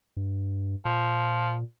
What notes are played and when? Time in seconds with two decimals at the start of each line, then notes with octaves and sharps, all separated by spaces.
0.17 G2
0.85 A#2 F3